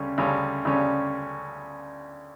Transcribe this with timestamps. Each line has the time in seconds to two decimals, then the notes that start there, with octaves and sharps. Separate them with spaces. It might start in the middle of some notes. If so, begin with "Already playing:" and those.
Already playing: D2 C#3 G3 C#4
0.18 D2 C#3 G3 C#4
0.65 D2 C#3 G3 C#4